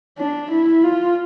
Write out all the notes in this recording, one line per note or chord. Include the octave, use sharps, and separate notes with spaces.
D4
E4
F4